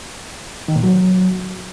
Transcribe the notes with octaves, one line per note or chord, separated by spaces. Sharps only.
D#3
A#2
F#3